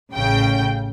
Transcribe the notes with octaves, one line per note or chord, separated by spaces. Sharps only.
A1 C#3 G5